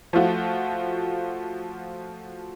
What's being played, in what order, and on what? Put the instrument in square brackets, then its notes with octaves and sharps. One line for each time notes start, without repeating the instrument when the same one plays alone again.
[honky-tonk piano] F3 A3 F4 F#4